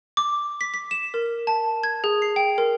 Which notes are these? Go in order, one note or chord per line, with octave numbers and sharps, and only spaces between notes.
D6
B6
B6
E7
A#4
A5
G#6
G#4
C7
G5
A#4